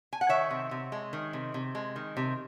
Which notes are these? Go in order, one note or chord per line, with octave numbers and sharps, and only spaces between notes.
G#5
F#5
D#3 C#5 E5
C3
C3
G#3
D#3
C3
C3
G#3
D#3
C3